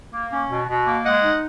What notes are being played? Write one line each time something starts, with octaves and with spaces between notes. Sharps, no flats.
A#3
C#4
B2
B2
A#3
G#3 D#5 F#5
D#4